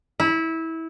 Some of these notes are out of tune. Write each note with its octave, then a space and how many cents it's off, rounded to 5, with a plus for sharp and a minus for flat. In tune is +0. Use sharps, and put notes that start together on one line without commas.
E4 -20